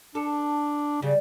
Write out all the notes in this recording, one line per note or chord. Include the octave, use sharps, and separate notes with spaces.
D4 A4
C#3 G3